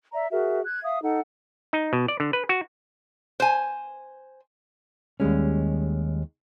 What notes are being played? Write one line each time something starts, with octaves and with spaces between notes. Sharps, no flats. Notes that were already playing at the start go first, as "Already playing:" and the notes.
D5 E5 A#5
F#4 G#4 A#4 E5
F#6 G#6
E5 F5 D#6
D#4 A4 F#5
D#4
B2
D5
D3
B4
F#4
C5 G#5
D#2 G3 G#3 C#4